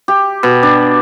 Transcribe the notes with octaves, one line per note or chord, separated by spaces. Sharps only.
G4
B2
D4